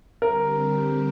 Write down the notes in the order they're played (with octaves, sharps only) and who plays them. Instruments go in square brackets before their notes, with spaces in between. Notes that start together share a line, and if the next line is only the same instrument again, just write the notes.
[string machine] D3 G3 C4 G4 [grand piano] A#4